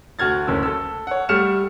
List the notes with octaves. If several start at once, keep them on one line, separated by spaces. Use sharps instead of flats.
D2 F#4 F6 G#6 A6
F#1 D2 C#4 E6
A4 E6
C#5 F#5
G3 A3 F#5 F6 C#7 E7